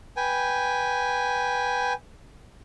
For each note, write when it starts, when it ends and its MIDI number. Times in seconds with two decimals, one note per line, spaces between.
0.17 1.93 71
0.17 1.93 79
0.17 1.93 80